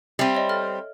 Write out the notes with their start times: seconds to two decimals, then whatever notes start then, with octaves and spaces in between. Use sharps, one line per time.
0.19 G3 C4 E5 D#7
0.35 C#5 D#5
0.49 A4 F6 A6